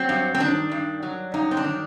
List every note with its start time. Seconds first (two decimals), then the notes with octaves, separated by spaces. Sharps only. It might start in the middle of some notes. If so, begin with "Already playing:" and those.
Already playing: F#3 C4
0.09 G2
0.35 C4
0.40 D#3 D4
0.72 G2
1.03 F#3
1.34 G2 D#4
1.51 C4
1.57 D4
1.64 D#3